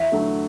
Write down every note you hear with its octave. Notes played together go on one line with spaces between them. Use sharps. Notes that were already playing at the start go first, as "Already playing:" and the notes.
Already playing: E2 E5
D3 F#3 A3